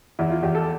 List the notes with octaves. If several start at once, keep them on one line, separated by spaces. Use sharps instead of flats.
E2 E4
F4
E2 G4
A4